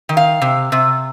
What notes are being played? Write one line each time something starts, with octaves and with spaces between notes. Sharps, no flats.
D#3
F5
C3
C3